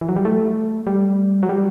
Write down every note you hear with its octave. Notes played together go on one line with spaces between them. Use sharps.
E3
F#3
G3
A3
G3
F#3
G3